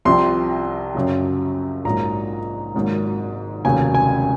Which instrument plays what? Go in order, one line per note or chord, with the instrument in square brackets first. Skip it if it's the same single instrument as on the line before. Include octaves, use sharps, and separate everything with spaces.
[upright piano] C2 C3 F3 C6
F#2 C#3 F#3
A#1 G#2 F#3 A#3 A#5
G#1 G#2 F#3 A#3
F1 D#2 C#3 F#3 A#3 G#5
G#5